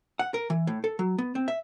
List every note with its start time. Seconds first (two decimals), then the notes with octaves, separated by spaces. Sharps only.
0.19 F#5
0.34 A#4
0.50 E3
0.67 A2
0.84 A4
0.99 F#3
1.18 B3
1.35 C4
1.48 E5